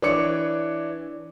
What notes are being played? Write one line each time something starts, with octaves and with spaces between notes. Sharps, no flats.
E3 D4 C#5 D6 C#7